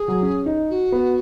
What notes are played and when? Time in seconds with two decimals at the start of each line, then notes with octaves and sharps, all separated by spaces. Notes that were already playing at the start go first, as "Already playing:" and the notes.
Already playing: G#4
0.08 F#3
0.23 C#4
0.46 D#4
0.70 F#4
0.92 B3